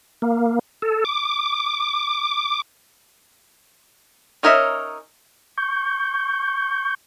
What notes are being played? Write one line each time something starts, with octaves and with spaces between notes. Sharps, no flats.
A#3
A4
D6
C#4 D#4 A#4 C#5 E5
C#6 G6